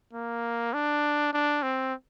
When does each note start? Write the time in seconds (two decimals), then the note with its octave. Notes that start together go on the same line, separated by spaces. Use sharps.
0.13 A#3
0.74 D4
1.33 D4
1.63 C4